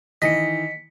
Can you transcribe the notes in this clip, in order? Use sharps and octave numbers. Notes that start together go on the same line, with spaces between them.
D#3 E3 D#5 B6 C#7